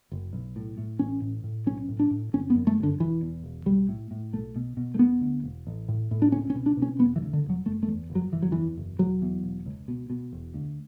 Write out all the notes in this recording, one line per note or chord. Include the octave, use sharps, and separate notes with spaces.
F#1
B1
A2
A2
A1 C#4
A2
A2
B1 C#4
A2
D4
A2
G1 C#4
B3
F#2
A3
G1
D3
E1 E3
E2
E1
B1 G3
A2
A2
B1 A3
B2
B2
A3
E1 B3
D2
E1
A1
A2
A2
D4
C#2 C#4
C#4
B2
D4
B2
C#4
E1 B3
E3
D2
D3
E1
F#3
F#1 A3
A3
E2
F#1
F#3
F#1 E3
F#3
E2 E3
F#1
E1 F#3
E2
E1
C#2
B2
B2
E1
D2